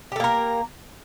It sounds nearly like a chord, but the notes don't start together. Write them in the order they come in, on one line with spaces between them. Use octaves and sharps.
G4 A4 A#3 A#4